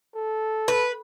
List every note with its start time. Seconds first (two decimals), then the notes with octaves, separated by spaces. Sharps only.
0.15 A4
0.68 B4